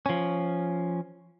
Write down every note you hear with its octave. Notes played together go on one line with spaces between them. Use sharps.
F3 C#4